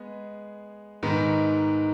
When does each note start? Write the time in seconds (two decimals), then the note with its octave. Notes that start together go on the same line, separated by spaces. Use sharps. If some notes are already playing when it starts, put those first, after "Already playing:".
Already playing: G#3 B3 G#4
1.03 G#2 D#3 B3